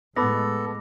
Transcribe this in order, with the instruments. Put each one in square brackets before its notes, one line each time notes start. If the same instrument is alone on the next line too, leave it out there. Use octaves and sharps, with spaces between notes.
[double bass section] A2 G#3 [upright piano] B3 [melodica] A4 [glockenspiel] B5 D6 A#6